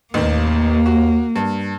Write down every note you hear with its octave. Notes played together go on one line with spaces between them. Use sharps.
A1 D#2 D#3 A#3
F#4
G2